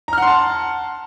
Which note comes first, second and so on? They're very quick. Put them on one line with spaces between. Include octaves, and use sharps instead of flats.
A#5 F6 F#5 C6 A5